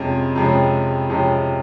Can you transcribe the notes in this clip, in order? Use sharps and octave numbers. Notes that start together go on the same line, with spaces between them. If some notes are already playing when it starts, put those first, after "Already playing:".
Already playing: F2 C3 F3 G#3 C#4
F2 C3 F3 G#3 C#4
F2 C3 F3 G#3 C#4